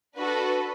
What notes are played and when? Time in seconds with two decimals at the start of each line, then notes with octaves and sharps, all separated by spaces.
0.16 D4 F#4 A4 B4